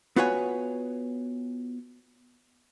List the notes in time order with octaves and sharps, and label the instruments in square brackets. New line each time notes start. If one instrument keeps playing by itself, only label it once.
[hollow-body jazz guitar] B3 F4 F#4 B4 C#5 G#5